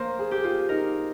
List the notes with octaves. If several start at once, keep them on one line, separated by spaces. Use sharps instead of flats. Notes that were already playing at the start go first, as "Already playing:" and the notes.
Already playing: A#3 C5
G#4
G4
F4
D#4 A#4